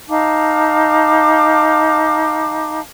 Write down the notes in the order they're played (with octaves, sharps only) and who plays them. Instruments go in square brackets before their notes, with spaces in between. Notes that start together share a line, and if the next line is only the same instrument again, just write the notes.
[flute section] D#4 F5 A5 D6